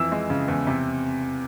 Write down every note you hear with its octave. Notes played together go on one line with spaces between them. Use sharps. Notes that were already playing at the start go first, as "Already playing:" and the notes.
Already playing: F2 E3 E6
G#3
C#3
E2
C3